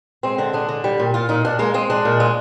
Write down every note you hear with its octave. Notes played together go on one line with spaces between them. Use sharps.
G#3 C4
D3 C4
G#3 D4
D3
G3
A#2
A#2 F4
A#2 D#4
A#2 D4
G#3 A#3
G#3 C4
G#3 D4
A#2
G#3